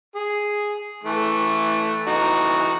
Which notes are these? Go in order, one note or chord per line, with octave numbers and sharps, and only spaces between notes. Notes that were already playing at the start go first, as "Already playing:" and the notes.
G#4
E3 A3
E3 D#4 F#4